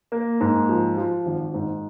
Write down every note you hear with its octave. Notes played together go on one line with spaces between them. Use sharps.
A#3
G#2
F3
F3
G#1
G#2